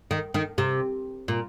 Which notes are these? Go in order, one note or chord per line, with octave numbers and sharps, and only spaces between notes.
D#3
D#3
C3
A#2